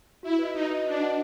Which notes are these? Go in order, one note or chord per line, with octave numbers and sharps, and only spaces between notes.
E4 F#4
B4 D#5
D#4 F#4
B4 D#5
D4 F#4
B4 D#5 F#5 A5